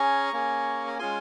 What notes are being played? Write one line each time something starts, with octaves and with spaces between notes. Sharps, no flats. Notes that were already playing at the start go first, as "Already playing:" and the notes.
Already playing: C#4 G#4 A#5 C#6
A#3 C#4 G#4
A#5
G#3 C#4 F4 G#4 G#5 C6